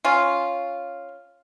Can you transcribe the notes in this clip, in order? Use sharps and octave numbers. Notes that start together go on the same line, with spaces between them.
C#4 F4